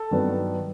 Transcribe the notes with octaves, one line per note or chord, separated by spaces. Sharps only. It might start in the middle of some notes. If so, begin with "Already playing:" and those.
Already playing: A4
G2 D#3 F#3 B3